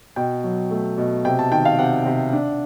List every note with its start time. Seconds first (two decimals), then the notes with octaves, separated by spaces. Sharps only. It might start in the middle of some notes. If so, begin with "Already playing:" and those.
0.16 B2 G5
0.44 F#3
0.71 A3
0.98 B2
1.25 C3 G5
1.39 A5
1.52 D#3 G5
1.65 F5
1.79 C3 F#5
2.06 C3
2.33 D4